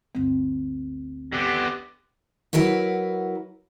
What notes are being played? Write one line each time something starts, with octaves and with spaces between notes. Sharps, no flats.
G1 D2 C4
D3 B3 G4
F#3 E4 A#4 B4 F#5